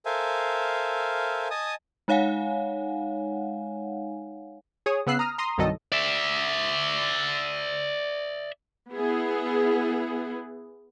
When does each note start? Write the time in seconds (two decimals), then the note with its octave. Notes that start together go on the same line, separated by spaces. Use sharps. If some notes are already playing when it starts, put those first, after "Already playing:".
0.06 A4 A#4 C5 E5 F5 G#5
1.51 D#5 G#5 A5 D#6
2.08 G#3 D#4 C#5 F5 F#5 G#5
4.86 G#4 C#5 D#6
5.07 C#3 B3 E6 F#6 C7
5.19 A#5 D#6 F6
5.38 A#5 C6 D#6
5.58 C2 G2 D#3 F#3 A4 D#5
5.92 D5 E5
8.92 B3 E4 G#4